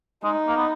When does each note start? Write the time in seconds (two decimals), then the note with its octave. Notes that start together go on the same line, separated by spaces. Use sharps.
0.24 G#3 D#4
0.47 A#3
0.57 B3